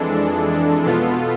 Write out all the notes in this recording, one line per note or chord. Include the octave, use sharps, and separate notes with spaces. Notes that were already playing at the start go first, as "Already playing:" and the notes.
Already playing: F2 E3 G#3 D4 A4
B2 B3 F4 A4